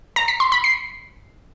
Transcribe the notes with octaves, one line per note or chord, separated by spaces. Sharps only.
A#5
B6
C6
B5
C7